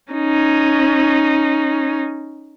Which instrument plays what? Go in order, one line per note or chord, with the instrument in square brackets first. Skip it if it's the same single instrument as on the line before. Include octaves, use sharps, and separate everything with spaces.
[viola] C#4 D#4